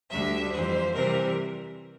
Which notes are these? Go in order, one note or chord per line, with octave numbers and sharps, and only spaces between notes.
D2 D3 G3 E5
F2 E3 G3 C5
C3 E3 G3 C4 A#4